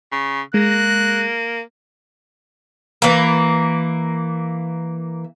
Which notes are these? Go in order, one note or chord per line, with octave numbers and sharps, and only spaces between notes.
C#3
G#3 A#3 F#6 A#6
E3 A#3